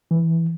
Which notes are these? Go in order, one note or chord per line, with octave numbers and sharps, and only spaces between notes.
E3